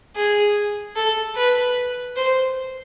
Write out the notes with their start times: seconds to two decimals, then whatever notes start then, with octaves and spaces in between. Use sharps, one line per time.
0.16 G#4
0.96 A4
1.36 B4
2.16 C5